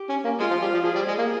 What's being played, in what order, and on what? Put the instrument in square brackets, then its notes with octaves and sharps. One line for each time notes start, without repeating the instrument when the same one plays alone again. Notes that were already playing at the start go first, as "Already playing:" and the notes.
Already playing: [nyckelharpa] G4
[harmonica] C#4
A#3
[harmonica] G#3 [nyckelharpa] F4
[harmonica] F3
G3
F3
[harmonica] F3 [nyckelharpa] G#4
[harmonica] G3
G#3
A#3